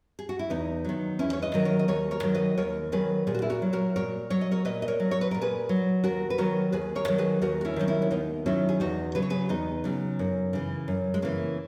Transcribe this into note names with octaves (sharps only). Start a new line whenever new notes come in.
G#4
F#4
E4
E2 B3 D#4
D#3 F#3
E2 C#4 E4
C#5
B4 D#5
D#3 F#3
A#4 C#5
D#5
D#2 A#4 C#5
A#4 C#5
D#3 F#3
B4 D#5
D#2 A#4 C#5
D#3 F#3 G#4 B4
A#2 G#4
F#4
E4 G#4
F#4 A#4
F#3
F#4 A#4
A#2 A#4 C#5
F#3 C#5
D#5
A#4 C#5
A#2 B4 D#5
D#5
A#4 C#5
F#3
C#5
B4
A#2 A#4
G#4 B4
F#3
D#2 F#4 A#4
B4
D#3 F#3 F#4 A#4
D#2 G#4 B4
A#4 C#5
D#3 F#3
G#4 B4
D#2 F#4 A#4
F#4
C#4 E4
D#3 F#3 D#4
C#4 E4
C#4
D#2 B3 D#4
D#3 F#3 C#4 E4
G#4
E2 D#4 F#4
C#3 F#3 B4
C#5
G#4 B4
E2 B3 D#4
C#3 F#3
F#2
C#3 E3
F#2
G#3
C#3 E3 A#3